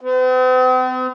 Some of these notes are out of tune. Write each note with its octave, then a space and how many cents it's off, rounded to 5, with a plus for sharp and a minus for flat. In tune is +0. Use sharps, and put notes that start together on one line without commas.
C4 -45